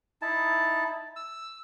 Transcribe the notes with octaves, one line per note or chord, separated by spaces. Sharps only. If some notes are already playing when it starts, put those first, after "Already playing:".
D#4 E4 A5
E6